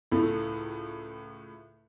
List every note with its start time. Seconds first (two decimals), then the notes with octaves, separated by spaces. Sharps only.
0.12 C#2 A2 A3